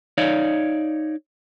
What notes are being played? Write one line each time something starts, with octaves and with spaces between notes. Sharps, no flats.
D#4 C#5 D5 F5